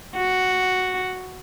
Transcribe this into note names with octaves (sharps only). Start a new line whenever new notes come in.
F#4